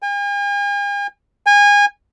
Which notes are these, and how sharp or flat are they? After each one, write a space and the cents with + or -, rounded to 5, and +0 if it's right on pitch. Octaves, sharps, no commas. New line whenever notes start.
G#5 -45
G#5 -25